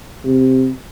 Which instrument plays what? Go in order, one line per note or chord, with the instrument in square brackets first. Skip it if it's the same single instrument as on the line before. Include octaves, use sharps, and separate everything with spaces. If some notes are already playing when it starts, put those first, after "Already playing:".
[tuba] C3